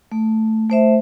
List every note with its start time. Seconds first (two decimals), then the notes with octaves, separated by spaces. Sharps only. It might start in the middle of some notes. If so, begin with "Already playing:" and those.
0.12 A3
0.70 A3 C5 E5